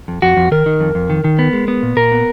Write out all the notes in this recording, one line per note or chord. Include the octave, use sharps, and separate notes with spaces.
F2
F2 F#4
F2
D#3 A#4
D#3
F2
F2
D#3
D#3
B3
G#3
B3
A#2
A#2 A#4
B3